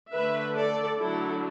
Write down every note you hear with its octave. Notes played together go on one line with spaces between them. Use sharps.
D3 A3 D4 B4 E5
A4 D5
D3 F#3 A3 D4 E4 A4